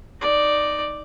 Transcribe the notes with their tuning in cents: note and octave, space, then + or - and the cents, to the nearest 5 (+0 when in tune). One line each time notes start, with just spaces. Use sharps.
D#4 +0 D5 +0